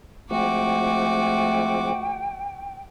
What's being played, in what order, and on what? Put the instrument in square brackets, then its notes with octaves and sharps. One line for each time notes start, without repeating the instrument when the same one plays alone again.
[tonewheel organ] F3 G#3 C4 [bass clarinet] A3 [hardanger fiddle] F#4 D6 [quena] G5